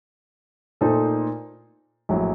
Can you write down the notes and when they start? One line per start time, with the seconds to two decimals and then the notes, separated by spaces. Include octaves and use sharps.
0.81 A#2 A3 D#4 A4 C5
2.09 A#1 A2 F#3